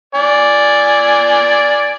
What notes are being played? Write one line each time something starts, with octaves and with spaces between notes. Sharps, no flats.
D5 G#5